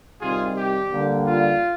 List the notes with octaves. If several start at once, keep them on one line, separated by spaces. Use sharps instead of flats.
C3 D#3 G3 F4 G#4
G4
D3 G3 A#3
F4